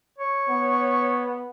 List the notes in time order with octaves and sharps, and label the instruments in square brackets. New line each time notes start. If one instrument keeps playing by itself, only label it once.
[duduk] C#5
[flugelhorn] B3